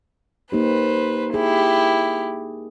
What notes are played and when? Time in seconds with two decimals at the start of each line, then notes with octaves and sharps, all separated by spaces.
0.52 A#3 D#4 G4 B4 C5
1.34 E4 G4 G#4